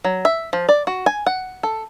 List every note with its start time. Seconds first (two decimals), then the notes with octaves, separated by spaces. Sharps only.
0.05 F#3
0.25 E5
0.53 F3
0.69 D5
0.87 F#4
1.06 G#5
1.26 F#5
1.63 A4